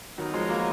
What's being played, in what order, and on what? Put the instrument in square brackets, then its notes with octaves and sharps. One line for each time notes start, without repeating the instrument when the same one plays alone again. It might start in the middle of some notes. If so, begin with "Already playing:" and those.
[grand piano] D#3 F#3 [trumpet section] B3 D#4 A#4 C#5
[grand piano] F3 G#3
F#3 A#3